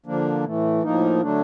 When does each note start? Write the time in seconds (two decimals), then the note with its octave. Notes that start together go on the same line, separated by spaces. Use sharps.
0.06 D3 F3 A#3 D4
0.44 A2 E3 A3
0.83 A2 F3 A#3 D#4
1.21 D3 F#3 A3 D4